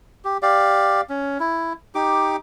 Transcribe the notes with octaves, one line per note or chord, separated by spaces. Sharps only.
G4
G4 D5 F5
C#4
E4
D#4 G4 D6